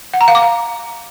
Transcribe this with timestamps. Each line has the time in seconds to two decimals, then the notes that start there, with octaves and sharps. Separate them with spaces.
0.14 F#5
0.21 A#5
0.28 F5
0.35 D6
0.42 F5